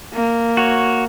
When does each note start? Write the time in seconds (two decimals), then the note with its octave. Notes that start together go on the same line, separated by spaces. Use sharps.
0.14 A#3
0.57 F#4 C#5